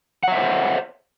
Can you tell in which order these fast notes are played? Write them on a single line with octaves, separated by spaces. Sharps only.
F#5 C#5 E5 C5